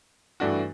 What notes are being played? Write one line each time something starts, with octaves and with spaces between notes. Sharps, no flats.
G2 E3 A3 D4 F#4